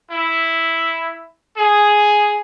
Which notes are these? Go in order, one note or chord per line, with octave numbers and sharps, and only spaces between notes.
E4
G#4